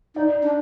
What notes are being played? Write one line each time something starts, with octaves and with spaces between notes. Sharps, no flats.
D#4 D5
D4